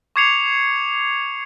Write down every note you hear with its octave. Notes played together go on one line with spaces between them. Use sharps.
C#6 D6 G#6 C7 C#7 F7